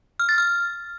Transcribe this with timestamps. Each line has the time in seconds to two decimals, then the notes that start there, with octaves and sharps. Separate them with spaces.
0.20 F6
0.29 A6
0.38 F6